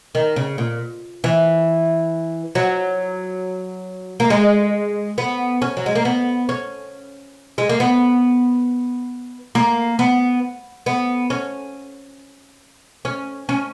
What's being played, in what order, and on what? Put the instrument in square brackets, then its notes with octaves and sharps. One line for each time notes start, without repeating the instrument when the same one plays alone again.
[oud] D#3
C#3
A#2
E3
F#3
A#3
G#3
B3
C#4
F#3
G#3
A#3
B3
C#4
G#3
A#3
B3
A#3
B3
B3
C#4
C#4
C#4